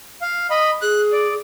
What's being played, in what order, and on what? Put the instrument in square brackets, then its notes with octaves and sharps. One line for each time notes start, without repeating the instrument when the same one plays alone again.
[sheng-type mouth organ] F5
D#5 B5
[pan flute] G#4 [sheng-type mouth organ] F#6
[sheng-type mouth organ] D5